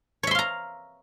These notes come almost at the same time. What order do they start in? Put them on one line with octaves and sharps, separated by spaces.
C#5 E5 C6 F5 A#5